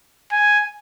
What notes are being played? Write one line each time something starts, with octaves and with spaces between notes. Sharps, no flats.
G#5